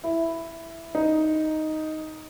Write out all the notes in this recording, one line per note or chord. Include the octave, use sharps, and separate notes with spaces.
E4
D#4